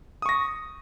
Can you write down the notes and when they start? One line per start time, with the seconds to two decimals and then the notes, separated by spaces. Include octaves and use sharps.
0.22 D#6
0.26 C#6
0.29 A#6